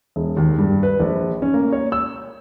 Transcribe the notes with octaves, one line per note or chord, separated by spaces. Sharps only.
E1
D#2
G2
B4
A#1
C#4
A#3
C#5
E6